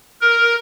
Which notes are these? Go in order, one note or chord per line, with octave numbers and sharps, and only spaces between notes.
A#4